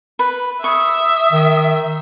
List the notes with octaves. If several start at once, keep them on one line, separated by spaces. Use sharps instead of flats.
B4
E5 C#6 D#6
D#3